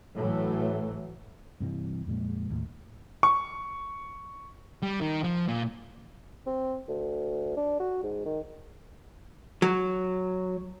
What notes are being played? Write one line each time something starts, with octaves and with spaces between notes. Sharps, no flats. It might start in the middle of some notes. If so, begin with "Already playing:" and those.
A2 E3 F#3 A3
G2 C3 E3
F2 A#2 G#3 A#3
D#2 A2
C#6
G3
D#3
F3
A#2
C4
D2
D4
F#4
G#2
D#3
F#3